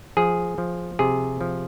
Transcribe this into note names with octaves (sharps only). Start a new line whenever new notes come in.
F3 G#4
F3
C3 G#4
F3